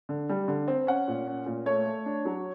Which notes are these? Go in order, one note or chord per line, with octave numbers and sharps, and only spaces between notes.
D3
G3
D3
C4
C#4 F#5
A#2
C#4
A#2
A3 C#5
A3
D4
F#3